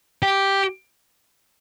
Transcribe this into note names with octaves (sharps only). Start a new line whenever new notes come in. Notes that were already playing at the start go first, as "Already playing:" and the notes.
G4